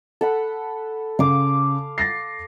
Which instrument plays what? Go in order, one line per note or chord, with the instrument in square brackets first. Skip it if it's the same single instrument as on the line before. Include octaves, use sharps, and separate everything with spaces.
[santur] A4 F#5 B5
[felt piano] C#3 [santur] F5 D6
[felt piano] A6 A#6 C7